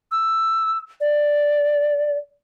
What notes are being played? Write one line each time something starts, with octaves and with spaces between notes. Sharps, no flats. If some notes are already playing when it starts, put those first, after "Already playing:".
E6
D5